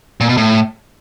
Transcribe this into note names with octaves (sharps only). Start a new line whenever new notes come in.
A#2
B2
A2